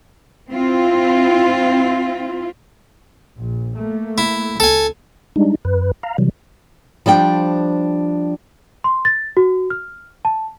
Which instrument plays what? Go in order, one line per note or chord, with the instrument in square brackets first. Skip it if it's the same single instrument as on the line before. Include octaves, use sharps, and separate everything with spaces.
[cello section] C4 E4 F4
[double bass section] A#1
A3 A#3
[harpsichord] E4
[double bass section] C#2 [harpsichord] A4 G#5
[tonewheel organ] G3 G#3 D4 D#4
F#2 B4
F5 A#5
C3 E3 F#3 G3
[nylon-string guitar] F3 G3 D4 G5
[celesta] C6
A6
F#4
F6
A5